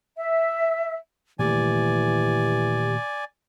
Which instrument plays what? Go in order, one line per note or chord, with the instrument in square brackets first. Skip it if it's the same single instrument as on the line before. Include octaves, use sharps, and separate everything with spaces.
[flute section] E5
[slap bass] A#2 D#3 A3 [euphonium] E3 [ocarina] G4 [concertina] D5 G#5